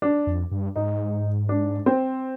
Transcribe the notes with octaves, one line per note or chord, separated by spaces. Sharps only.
D4
F2
G2
G#2 D#4
D4
C4